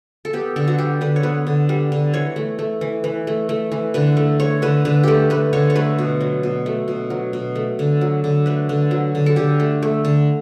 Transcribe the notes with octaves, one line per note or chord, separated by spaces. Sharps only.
A4
B3 G4
D3 A4
F#4
G3 G4
D3 B4
C#5
B3 B4
D3
G3
D3
E3 C#5
A3
A3
E3
E3
A3
A3
E3
D3 B4
A3
A3 C#5
D3 B4
D3 B4
A3 G4 A4
A3 B4
D3 C#5
C#5
A3 B4
B2
F#3
B2
A3
B2
F#3
B2
A3
D3
F#3
D3
A3 B4
D3
F#3
D3
A4
D3 G4
A3
A3
D3